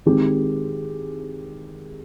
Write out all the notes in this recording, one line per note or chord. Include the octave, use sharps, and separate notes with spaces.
D#3 G#3 C4 G4